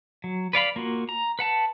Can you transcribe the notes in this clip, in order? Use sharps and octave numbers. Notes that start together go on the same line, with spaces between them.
F#3
B4 D5 F5 B5
A#3 F4 F#4
A#5
B4 F#5 A5